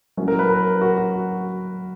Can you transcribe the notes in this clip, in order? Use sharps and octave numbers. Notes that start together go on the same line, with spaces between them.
F#3 A#3 C#4 E4
A#4
B4
A#4
F#4
F#4